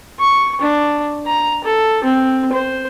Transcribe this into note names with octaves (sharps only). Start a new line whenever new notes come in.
C#6
D4
A#5
A4
C4
C5